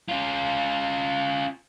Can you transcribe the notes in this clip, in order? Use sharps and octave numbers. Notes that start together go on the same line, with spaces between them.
C#4 F4